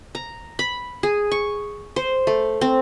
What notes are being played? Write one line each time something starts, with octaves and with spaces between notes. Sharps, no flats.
A#5
B5
G#4
C#6
C5
A3
C4